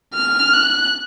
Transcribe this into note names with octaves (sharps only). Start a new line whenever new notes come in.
F6
F#6